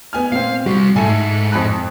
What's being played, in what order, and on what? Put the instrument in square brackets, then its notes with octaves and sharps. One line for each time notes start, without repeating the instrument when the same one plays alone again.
[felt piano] B3 G#5 F6
[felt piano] A#2 C4 [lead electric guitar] F5
[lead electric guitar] G3 C4 [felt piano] F#4
[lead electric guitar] B1 G#2 [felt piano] A3 A4 G#5
[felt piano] F2 B5 F#6